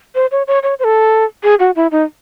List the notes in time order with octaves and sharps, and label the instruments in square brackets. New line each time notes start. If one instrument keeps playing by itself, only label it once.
[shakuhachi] C5
C#5
C#5
C#5
C5
A4
G#4
F#4
E4
D#4